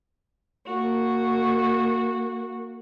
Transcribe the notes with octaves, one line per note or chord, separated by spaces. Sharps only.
A#3 F#4